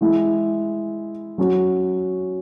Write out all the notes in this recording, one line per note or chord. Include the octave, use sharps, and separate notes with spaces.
E3 G#3 E4
F#3 C#4 F#4